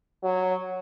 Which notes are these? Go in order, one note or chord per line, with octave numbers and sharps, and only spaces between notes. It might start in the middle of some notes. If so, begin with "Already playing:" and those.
F#3